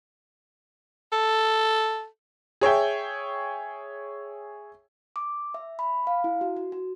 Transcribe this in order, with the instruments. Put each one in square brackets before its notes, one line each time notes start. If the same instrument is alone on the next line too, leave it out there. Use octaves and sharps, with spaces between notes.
[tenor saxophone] A4
[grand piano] G#4 C#5 E5 G5
[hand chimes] D6
E5
B5
F5
E4
F#4
F#4
F#4